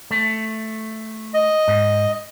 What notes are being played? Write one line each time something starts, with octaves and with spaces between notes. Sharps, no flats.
A3
D#5
G#2